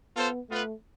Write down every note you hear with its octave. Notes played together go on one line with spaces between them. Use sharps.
B3 F4 A4 C5
A3 B3 F4 B4